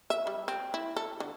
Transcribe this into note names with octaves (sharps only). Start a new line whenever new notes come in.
E5
G3
C4
E4
A4
D3